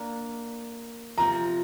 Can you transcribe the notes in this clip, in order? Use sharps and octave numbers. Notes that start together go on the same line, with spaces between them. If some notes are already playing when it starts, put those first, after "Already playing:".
Already playing: A#3 D4
C3 F3 C4 F4 A#5